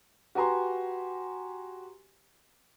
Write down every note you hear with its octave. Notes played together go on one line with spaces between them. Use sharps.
F#4 G4 B4 G#5 A#5 C6